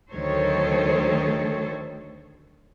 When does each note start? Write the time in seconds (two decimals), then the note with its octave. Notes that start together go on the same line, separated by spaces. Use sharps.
0.11 D2 D#3 F#3 A4 C5 C#5